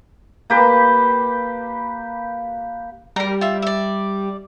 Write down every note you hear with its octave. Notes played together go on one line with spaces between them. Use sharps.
A#3 G4 B4
G3 A#4 A#5
F4 E5
D5 E5